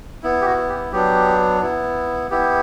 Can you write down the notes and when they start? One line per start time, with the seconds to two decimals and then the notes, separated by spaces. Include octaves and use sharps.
0.23 B3 E4
0.41 G4
0.46 F#4
0.69 G4
0.92 F#3 B3 D4 G4
1.61 B3 E4
2.31 B3 E4 G4